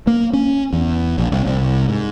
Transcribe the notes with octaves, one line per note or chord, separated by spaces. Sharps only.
A#3
C#4
E2
A#1
C2
C2
G#2